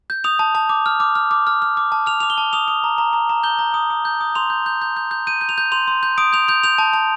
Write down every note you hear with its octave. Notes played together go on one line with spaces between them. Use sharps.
G6
D#6 F7
A5
A5
D6
F6
D6
F6
D6
F6
F6
D6
A5
F6 F7
D6 F7
G7
A5
D#6 F7
D#6
A#5
A#5
A#5
A#5
G6 G7
A#5
D#6
D#6
G6
D#6
C6 F7
G6
G6
G6
G6
G6
G6 D#7
G6
F7
G6
C6 F7
C6
G6
D#6 D7
G6 F7
G6 F7
G6 F7
A5
A5